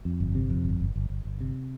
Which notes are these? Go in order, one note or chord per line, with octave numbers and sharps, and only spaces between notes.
F2
G1
C3
F2
G1
G1
G1
G1
G1
C3